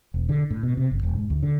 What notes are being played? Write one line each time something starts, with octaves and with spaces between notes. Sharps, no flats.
E1
D3
A2
B2
C3
G1
E1
G#2
D2
D3